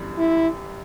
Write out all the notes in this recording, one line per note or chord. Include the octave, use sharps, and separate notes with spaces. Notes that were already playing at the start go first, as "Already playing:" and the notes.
Already playing: G1 F#2 E3 G3
E4